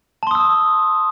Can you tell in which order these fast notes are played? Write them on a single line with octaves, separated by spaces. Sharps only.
A5 C6 D#6 E6